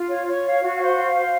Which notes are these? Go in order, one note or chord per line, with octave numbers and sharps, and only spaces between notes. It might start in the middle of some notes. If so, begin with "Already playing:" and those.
Already playing: F4
C#5
C#5
F5
F#4
C5
F5
C5